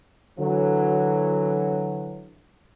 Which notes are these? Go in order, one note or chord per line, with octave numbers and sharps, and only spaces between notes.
D3 E3 F#3